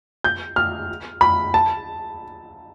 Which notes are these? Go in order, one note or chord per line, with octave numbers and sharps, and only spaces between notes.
G6
F6
B5
A5